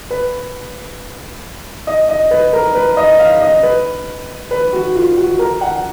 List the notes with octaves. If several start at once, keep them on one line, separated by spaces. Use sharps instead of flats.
B4
D#5
D#5
B4
A#4
B4
D#5
F5
D#5
B4
B4
F#4
F4
F#4
A#4
F#5